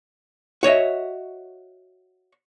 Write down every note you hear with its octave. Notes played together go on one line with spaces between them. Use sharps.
F#4 C#5 D#5 E5